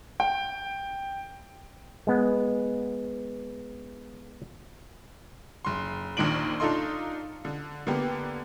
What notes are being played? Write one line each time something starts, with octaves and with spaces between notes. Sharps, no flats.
G5
G#3 B3
F#1 C6
A#1 D#2 D#3 D4 D7 F#7
D4 D#4 F4 A4 D#5 C6
D3
D3 A#3 B3 G4